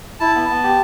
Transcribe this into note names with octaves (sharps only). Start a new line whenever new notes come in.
E4 A5
B3
B3
G4